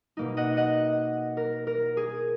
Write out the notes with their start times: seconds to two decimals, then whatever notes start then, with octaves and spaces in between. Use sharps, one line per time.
0.17 B2 A#3 D#4
0.37 D#5 F#5
0.57 D#5 F#5
1.37 A#4
1.67 A#4
1.97 G#4